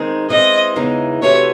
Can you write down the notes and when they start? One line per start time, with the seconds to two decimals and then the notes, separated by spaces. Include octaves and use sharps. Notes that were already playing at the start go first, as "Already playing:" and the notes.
Already playing: D#3 G#3 C4 D#4 G#4
0.30 E3 G#3 C4 D#5
0.76 E2 C#3 E3 G#3 D#4
1.22 C3 E3 A3 C#4 F#4 C#5